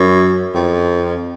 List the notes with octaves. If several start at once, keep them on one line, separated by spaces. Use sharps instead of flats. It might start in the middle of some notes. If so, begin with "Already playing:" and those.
Already playing: F#2
F2